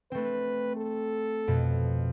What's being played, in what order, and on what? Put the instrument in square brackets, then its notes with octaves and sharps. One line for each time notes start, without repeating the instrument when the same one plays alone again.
[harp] A3 C4 [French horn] B4
[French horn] A4
[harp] F2 B2